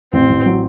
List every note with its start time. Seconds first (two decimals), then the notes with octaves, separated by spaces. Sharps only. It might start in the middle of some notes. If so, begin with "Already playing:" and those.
0.13 A1 C4
0.30 A1
0.46 F#3